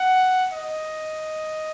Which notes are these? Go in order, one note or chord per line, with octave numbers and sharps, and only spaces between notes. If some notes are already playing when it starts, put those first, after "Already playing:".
Already playing: F#5
D#5